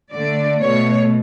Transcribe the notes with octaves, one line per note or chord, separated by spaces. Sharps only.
D3 A3 D5
B2 A3 C#5